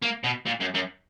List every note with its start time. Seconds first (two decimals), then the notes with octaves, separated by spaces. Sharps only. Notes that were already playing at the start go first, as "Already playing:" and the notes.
0.02 A#3
0.24 B2
0.46 A#2
0.60 F#2
0.74 F#2